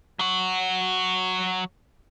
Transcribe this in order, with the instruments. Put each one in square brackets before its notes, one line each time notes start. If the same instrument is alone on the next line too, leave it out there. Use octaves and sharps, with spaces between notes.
[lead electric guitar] F#3 F#4